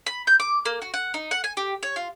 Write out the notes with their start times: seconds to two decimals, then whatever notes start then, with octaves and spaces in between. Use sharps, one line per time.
0.06 B5
0.27 G6
0.40 D6
0.65 A#3
0.82 F#4
0.94 F#5
1.14 D#4
1.31 F#5
1.44 G#5
1.57 G4
1.83 C#5
1.96 F4